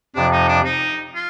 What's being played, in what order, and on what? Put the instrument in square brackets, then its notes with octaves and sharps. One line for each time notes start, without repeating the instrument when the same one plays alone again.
[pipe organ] F2 C3 F3 [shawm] D4
[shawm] D#4
D4
D#4
F4